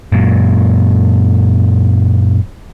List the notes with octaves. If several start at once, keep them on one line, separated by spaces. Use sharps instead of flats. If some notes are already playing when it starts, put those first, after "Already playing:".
F#2 A#2